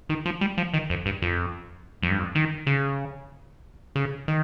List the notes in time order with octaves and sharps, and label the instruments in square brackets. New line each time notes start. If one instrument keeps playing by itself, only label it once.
[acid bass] D#3
F3
G3
F3
D#3
F2
G2
F2
F2
G2
F2
D#3
C#3
C#3
D#3